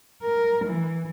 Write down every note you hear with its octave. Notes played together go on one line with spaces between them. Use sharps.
A#4
E3